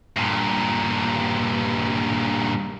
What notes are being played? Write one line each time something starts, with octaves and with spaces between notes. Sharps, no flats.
G2 A#2